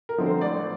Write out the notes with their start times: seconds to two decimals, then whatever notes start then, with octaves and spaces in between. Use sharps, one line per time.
0.09 A#4
0.18 D3 F3 A3 C4
0.26 C5
0.41 A1 D5